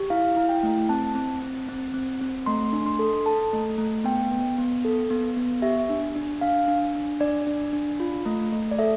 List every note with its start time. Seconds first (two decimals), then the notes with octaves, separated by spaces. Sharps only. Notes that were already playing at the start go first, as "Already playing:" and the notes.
Already playing: G4
0.10 E4 F5
0.36 E4
0.49 G5
0.63 A3
0.89 C4 A5
1.15 C4
1.42 C4
1.69 C4
1.94 C4
2.21 C4
2.46 A3 C6
2.73 D4
2.86 C6
2.99 A4
3.26 A4 A5
3.53 A3
3.78 A3
4.04 B3 G5
4.31 B3
4.58 B3
4.85 A4
5.10 B3
5.37 B3
5.62 G4 E5
5.90 D4
6.16 D4
6.41 D4 F5
6.68 D4
6.95 D4
7.21 D4 D5
7.47 D4
7.73 D4
8.00 F4
8.26 A3
8.52 A3
8.71 D5
8.79 A4 E5